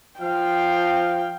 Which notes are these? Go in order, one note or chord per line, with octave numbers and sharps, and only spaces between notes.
F3 F5 G5